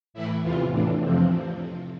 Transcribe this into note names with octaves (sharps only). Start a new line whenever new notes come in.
A2 E3 E4
E2 C3 E3 F4
A2 E3 D4
F2 C3 F3 C4